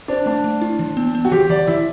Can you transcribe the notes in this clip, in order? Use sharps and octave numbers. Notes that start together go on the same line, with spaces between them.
D4 C5
A3 D4
A3
E4
E3
B3
B3
F#4
E3 G4
E3 D5
E3 E4